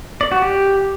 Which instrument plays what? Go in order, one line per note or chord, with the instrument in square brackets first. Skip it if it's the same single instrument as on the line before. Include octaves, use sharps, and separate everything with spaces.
[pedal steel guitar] D5
F#4
G4